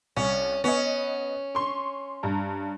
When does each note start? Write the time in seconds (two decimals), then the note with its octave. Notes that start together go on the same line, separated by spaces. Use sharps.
0.16 C2 C#4
0.64 B3 C#4 D#5
1.55 C6 C#6
2.23 G2 A#5